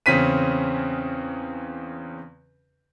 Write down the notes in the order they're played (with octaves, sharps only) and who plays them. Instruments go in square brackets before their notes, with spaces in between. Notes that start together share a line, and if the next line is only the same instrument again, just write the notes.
[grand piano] E2 C#3 C4 C#4 B6 D#7